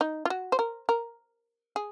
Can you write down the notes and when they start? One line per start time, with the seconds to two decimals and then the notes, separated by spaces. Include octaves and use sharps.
0.01 D#4
0.25 F4
0.30 F#4
0.52 C5
0.59 A#4
0.89 A#4
1.76 G#4